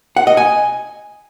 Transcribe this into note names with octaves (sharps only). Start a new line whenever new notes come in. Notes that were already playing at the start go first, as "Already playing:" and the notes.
F#5
D#5
G#5